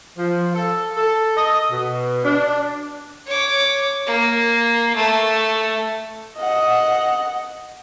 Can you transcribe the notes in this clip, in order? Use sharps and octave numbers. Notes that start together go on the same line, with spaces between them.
F3
A4
A4
D#5
B2
D4
C#5 D6
A#3
A3
D#5 F#5